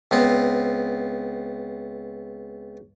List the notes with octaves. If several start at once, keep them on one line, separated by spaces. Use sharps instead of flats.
C#2 B3 C4